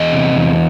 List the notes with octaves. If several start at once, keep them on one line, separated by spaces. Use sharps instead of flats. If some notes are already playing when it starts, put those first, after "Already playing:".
Already playing: E2 D#5
C3
E2